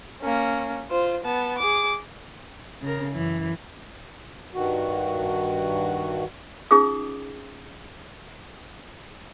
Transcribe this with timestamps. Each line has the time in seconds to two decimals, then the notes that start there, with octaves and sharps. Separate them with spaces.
0.21 A#3 C#4
0.90 F4 C5
1.24 B3 A5
1.58 G#4 D6
2.82 C#3 A#4
3.12 F#2 E3
4.55 G2 D#3 F#4
6.71 C#4 D#4 F4 G#4 D6 D#6